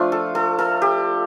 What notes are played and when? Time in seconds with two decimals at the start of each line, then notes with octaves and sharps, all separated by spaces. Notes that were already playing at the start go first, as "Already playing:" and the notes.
Already playing: F3 A3 D4 F4
0.12 A4
0.35 A4
0.59 A4
0.82 G4